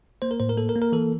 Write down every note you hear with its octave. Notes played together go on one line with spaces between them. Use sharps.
A#3 C5
A#4
A2 C5
A#4
A#3 A4
A#4
A#3
A#4
E3 A4